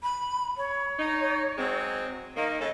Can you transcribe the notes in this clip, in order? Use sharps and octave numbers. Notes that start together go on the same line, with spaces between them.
B5
C#5
D#4
F#3 G#3 C4
D#3 A#3 D#5
C#3 C#4 A4